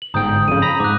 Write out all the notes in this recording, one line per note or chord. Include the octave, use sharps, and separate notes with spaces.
F#7
G1 G#2 G5 A#5 D#6 G6
F2 C#3 D#7
A#5 B5 A#6
G#2 D6 F#6